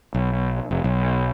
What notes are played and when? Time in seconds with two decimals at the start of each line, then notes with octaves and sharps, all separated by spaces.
0.14 B1
0.71 F1
0.84 B1